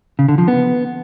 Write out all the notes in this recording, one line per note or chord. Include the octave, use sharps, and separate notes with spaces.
C#3
D3
F3
B3